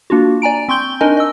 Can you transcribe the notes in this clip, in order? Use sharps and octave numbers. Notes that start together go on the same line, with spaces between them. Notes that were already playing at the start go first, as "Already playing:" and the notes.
A#3 D4 F4 F#4
D5 G#5 A#5 D7
C4 C6 C#6 G6 G7
D4 D#4 A#4 D#5 G#5
D#5 E6